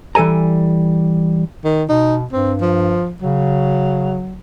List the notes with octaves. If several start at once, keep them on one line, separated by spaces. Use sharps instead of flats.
E3 G3 A4 G#5 A#5
D#3
B2 D#4
G2 C4
F3
C#3 F#3